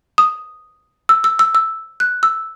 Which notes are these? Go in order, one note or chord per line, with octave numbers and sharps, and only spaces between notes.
D#6
E6
E6
E6
E6
F#6
E6